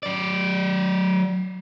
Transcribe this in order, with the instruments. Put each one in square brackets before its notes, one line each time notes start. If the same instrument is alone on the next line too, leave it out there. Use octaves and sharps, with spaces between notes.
[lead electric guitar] F#3 D5